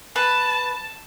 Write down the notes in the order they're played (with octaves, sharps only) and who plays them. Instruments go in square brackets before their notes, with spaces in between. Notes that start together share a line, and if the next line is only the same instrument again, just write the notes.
[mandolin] B4 [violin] A5